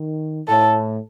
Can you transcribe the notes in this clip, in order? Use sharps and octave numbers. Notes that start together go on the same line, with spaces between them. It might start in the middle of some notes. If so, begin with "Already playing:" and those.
Already playing: D#3
A2 A4